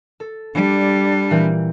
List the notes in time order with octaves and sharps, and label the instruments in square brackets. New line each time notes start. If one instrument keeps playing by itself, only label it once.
[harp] A4
[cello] G3 [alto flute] D4
[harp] A#2 E3 C4